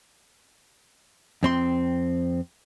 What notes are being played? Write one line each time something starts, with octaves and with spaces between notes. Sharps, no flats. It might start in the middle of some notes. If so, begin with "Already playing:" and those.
F2 C4 C6